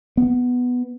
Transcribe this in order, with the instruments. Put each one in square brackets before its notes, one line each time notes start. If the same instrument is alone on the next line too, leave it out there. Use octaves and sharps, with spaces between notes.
[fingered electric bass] B3